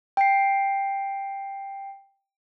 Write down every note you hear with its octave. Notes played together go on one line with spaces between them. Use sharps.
G5 C7